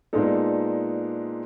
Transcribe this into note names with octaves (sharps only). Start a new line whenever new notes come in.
A#2 G#3 B3 D4 D#4 A4